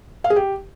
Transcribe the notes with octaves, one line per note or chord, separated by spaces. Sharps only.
F5
G#4
G4